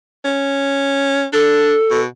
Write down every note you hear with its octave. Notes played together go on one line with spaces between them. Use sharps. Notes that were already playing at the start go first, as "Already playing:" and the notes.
C#4
D4 A4
B2